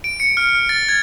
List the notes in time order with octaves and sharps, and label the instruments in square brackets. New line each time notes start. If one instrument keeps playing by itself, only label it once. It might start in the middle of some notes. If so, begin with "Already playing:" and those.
[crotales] D7
C#7
F6
A6
G#6